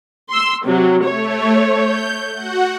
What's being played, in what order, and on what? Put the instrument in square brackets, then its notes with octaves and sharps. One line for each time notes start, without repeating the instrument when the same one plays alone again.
[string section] C6 E6
C3 F#3
[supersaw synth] A3 [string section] C#5
[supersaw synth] G6
F#4 F#5